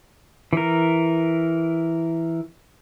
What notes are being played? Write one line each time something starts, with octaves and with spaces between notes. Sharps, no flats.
E3 A#4